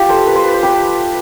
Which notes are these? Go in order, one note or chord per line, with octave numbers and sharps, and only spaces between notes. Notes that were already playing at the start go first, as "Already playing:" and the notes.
Already playing: F4 G4
A4 C5
B4
C5
B4
C5
G4 B4